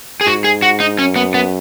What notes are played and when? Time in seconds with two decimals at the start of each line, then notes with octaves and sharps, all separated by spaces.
0.21 G#4
0.26 G#2 F#4
0.44 G#4
0.62 F#4
0.80 D#4
0.99 F#2 C#4
1.16 B3
1.34 B3